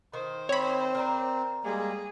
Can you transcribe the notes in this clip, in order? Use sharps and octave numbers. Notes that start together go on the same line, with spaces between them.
D#3 C5
C4 C#5 B5
A#4 D5 A#5
G3 G#3 A#3 G#4